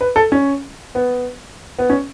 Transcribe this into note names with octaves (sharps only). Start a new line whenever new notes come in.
B4
A4
C#4
B3
B3
C#4